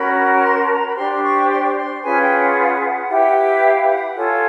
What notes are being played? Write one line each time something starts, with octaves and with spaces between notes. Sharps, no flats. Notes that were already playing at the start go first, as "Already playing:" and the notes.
Already playing: C#4 F#4 A#4 B5
C#6
C6
A5
A#5
B5
D4 G4 C5 C6
C6
C#6
C6
C6
C#4 F4 G#4 B4 G#5
G5
F#5
E4 G4 B4
F5
F#5
F4 A4 C#5 G#5